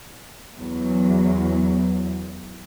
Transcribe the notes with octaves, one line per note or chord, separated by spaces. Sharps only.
E2 F#3